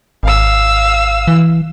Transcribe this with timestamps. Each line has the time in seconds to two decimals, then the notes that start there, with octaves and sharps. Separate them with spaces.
0.23 G#1 F5 E6
1.28 E3